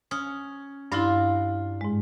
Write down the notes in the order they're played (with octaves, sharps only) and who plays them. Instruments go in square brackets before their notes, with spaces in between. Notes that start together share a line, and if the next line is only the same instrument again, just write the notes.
[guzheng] C#4 [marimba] D#6
[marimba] G2 E4 [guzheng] D4 F4
[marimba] G#2 G#3